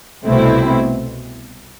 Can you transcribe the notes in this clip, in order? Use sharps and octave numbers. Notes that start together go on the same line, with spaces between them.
C2 B2 A3 C4 E4